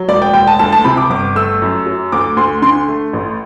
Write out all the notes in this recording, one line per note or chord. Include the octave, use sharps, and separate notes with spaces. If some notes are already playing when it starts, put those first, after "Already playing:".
Already playing: F#3
E1 D5
G5
E1 G5
A5
D2 A5
A5
C3 B5
D6
G1 D6
A3 E6
F#2
F#3
D2 D6
D2 C6
D3 C6
A3
A1